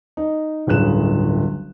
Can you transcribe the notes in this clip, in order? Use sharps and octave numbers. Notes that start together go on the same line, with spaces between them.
D#4
D1 G1 C#3 F#6 E7